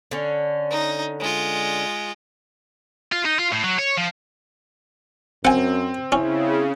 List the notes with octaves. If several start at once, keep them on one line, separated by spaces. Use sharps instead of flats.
D3 C#4
D#4
G#3 F4
F4
D#4
F4
A2
F#3
C#5
F3
F#2 C4 F#5 G#5
C#3 C#4 E4